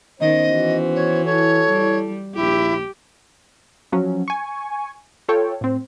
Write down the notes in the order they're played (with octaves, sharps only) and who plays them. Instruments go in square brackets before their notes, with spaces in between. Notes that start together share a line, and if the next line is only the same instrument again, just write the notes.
[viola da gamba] D#3 [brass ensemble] B3 C#4 C5 [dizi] D#5
[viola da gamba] E3 F#4
[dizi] C#5
[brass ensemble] E4 A4 [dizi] C#5
[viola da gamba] G3
[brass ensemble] A#1 D#2 [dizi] E4 [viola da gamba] G4
[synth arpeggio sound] F3 F#3 C#4
G#5 C#6
F4 A4 C#5 G5
A2 C4